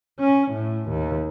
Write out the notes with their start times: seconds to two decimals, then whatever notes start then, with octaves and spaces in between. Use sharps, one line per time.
0.20 C#4
0.52 A2
0.90 D#2